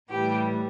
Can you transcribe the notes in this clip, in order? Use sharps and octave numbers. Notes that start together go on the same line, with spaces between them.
A2 E3 G3 G4